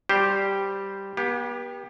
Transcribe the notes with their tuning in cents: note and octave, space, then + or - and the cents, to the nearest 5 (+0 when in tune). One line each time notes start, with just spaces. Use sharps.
G3 +0 G4 +0 C5 +0
B3 -40 G4 +15